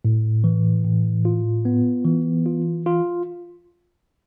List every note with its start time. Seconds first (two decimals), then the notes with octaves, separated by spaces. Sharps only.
0.05 A2
0.44 E3
0.85 A2
1.25 F4
1.65 B3
2.05 E3
2.46 F4
2.86 F4